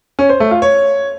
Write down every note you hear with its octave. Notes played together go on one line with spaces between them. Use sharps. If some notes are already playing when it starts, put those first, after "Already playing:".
C#4
C5
A3
F4
C#5